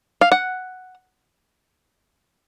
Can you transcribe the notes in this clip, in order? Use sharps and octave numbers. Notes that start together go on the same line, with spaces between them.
F5
F#5